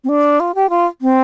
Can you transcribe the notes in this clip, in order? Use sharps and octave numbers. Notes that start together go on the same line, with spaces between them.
C4
D4
F4
G4
F4
C4